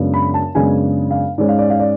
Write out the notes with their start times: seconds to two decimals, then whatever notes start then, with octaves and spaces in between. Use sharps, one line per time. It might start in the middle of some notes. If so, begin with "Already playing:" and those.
Already playing: F#2 C#3 G#3 B3 D4
0.14 B5
0.34 A5
0.55 F#2 C#3 G#3 B3 D4 G#5
1.11 F5
1.38 G#2 G#3 C#4 D5
1.49 F5
1.59 D5
1.70 F5
1.80 D5